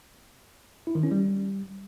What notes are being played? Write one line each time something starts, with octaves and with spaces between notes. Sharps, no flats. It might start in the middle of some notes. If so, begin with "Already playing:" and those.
E4
D#3
C#4
G3